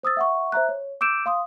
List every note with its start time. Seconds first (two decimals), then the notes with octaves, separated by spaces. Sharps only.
0.03 C5 D#6 E6 A6
0.17 E5 F#5 C#6
0.52 C5 E5 A#5 F#6
0.69 C#5
1.01 D6 E6 G6 D7 E7
1.26 F5 C6 D#6